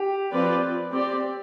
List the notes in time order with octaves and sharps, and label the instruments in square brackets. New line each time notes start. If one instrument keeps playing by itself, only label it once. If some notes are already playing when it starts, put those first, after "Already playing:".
Already playing: [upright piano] G4
[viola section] F3 C4 F4 B4 D5
C4 G4 D5